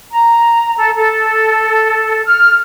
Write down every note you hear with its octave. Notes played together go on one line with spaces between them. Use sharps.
A#5
A4
A4
F6